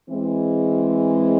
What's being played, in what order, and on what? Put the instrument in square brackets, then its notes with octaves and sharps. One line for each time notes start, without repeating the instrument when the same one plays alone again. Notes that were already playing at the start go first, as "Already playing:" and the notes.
[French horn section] E3 G#3 C4